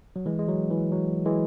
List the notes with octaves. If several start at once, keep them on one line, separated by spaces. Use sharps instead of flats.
F#3
E3 G#3
G#3
F#3
E3
F#3
E3 G#3